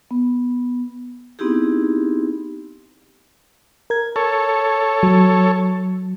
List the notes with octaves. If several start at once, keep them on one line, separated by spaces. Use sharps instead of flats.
B3
B3 C4 D#4 E4 G4 G#4
A#4 G#6
A4 C#5
F#3